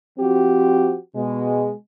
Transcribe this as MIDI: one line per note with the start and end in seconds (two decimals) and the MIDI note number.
0.19 0.96 53
0.19 0.96 60
0.19 0.96 66
0.19 0.96 67
1.16 1.70 47
1.16 1.70 56